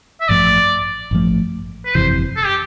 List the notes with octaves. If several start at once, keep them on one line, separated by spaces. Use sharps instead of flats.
E5
A1 G2 F3 A3 D5
A1 G2 F3 A3
B4
G1 F2 C3 E3 C5
A4
G4